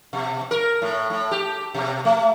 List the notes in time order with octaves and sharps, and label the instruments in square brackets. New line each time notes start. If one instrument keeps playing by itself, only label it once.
[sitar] B2
A#4
A2
A2
G4
B2
A3